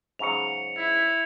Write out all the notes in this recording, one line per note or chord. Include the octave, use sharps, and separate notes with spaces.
G#2 C#3 F#3 C#7 F7
E4